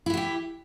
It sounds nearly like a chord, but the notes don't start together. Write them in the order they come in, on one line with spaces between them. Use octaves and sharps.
E4 E3 F#4 G4